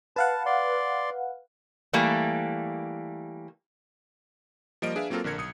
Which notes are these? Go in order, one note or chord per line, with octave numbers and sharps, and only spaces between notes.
B4 F5 F#5 A5
D5 C6
E3 G3 A3 A#3
F3 G3 A#3 A#4 D#5 D7
D4 G#4 B4 E5 F5
F#3 A#3 C4 F4 A4 A#4
A#1 D3 A#4 G#6 C#7
B1 D#6 C#7